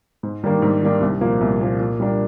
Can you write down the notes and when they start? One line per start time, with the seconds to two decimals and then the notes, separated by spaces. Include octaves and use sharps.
0.23 G#2
0.43 D#3 G3 A#3 D4
0.62 G#2
0.82 D#3 G3 A#3 D4
1.01 C2
1.21 A#2 F3 A#3
1.41 C2
1.61 A#2 F3 A#3
1.80 A#2
2.00 G3 A#3 D4